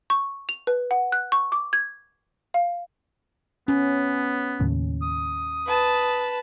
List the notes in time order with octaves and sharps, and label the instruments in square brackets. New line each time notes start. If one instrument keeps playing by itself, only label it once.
[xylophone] C#6
F7
B4
F#5
F#6
C#6
D6
G#6
F5
[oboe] B3 [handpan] C#4
[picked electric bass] D#2 A2 C#3
[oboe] D#6
[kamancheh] B4 A5